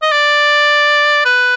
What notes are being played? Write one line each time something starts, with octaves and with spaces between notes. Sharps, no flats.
D#5
D5
B4